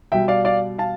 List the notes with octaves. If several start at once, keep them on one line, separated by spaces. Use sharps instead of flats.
B2 G3 E5 G5
D5 F5
D5 F5
F5 A5